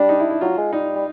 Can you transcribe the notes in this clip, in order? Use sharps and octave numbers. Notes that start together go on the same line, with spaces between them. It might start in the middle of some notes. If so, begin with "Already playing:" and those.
Already playing: G3 D4
D#4
E4
E4
F#3 F4
G#3
G3 D#4
G3